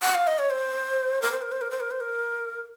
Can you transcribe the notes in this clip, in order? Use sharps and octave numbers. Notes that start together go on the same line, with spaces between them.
F#5
F5
D#5
C#5
C5
A#4
C5
A#4
C5
A#4
C5
A#4
C5
A#4